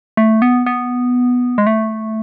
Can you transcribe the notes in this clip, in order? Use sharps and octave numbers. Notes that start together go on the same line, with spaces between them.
A3
B3
B3
G#3
A3